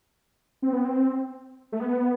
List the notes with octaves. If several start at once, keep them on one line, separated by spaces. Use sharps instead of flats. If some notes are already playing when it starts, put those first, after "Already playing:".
C4
B3
C4
A3
B3